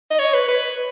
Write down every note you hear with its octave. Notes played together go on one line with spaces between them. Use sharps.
D#5
C#5
B4
B4